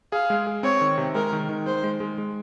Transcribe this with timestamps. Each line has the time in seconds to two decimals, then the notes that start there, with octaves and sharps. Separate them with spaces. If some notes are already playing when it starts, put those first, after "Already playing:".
0.12 G#4 F5
0.30 G#3
0.47 G#4
0.63 C4 C#5
0.81 D#3
0.98 C3
1.15 G#3 A#4
1.33 D#3
1.49 D#3
1.66 G#3 C5
1.84 G#3
2.00 G#3
2.18 G#3